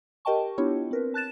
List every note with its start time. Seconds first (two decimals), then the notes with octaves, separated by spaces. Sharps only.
0.25 G4 A#4 D#5 G5 A5 C#6
0.58 B3 D4 E4 F4 G4 C#5
0.91 C4 A#4 B4
1.14 A5 F#6 A6 E7